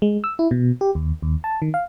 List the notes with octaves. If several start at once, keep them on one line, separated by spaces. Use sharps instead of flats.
G#3
E6
E4
B2
G4
D#2
D#2
A5
D#3
F5